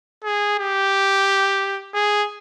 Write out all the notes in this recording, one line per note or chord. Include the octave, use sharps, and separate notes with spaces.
G#4
G4
G#4